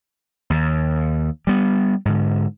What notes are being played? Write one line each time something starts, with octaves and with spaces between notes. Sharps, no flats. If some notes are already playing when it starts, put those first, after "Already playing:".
D#2
G3 B3
G#2 D3